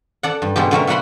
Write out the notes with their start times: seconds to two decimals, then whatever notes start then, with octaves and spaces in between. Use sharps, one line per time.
0.23 A4 D5 F#5
0.42 G2
0.56 B2 D3 G#3 G4
0.71 D3 F#3 A3 A#4
0.87 B2 F#3 A#3 F#5 B5 C6